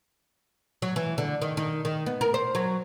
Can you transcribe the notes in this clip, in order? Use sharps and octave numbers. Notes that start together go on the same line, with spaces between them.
F#3
E3
D3
D#3
D#3
D#3
B3
A#4
C5
F#3